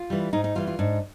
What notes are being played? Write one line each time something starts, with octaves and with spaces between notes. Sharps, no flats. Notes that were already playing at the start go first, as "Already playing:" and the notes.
Already playing: F4
E3 G3
G#2 D#4
D#4
E3 G3 F4
F4
G#2 D4